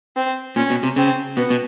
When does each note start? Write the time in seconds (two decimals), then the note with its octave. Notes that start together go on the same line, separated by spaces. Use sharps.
0.16 C4
0.56 A#2 C#4
0.70 B2
0.83 C3
0.96 C#3 C4
1.37 B2 B3
1.50 B2